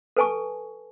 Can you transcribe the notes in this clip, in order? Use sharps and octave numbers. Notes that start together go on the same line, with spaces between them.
A4 B4 G#5 A5 C#6